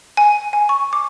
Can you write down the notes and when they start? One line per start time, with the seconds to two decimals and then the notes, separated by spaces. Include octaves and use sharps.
0.17 G#5
0.53 G#5
0.69 C#6
0.93 D6